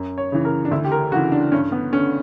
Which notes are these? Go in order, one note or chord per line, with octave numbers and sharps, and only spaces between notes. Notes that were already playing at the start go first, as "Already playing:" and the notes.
Already playing: F#2
C#5
C#3 E3
A#4
D4
D2 E4
G4
A#4
C#3 E3 F#4
D4
G2 C#4
B3
D3 C#4